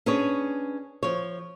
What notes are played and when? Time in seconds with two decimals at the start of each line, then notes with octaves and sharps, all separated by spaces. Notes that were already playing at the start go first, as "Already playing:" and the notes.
0.06 C#4 D4 G#4 B4 C#5
1.03 F3 C#5